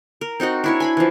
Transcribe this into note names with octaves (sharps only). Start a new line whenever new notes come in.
A#4
C4 D#4 F#4 D#5
D4 E4 C#5
G#5 B5 C6
E3 F3